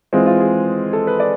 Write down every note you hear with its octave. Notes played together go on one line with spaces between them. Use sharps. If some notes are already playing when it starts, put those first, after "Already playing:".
E3 G#3 C4 F4
F4
G#4
A4
B4
D5